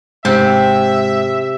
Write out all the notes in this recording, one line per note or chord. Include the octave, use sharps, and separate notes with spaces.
G#2 C3 G4 E5